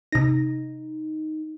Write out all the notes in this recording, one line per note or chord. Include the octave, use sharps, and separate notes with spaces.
C3 D#4 A#6